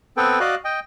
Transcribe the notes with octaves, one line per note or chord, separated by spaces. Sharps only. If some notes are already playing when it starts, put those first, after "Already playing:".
B3 C4 A4 B4 G5
F#4 D5 D#5 F5 F#6
D#5 G5